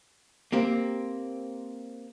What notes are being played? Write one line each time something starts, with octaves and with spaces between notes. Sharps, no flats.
A#3 C4 G4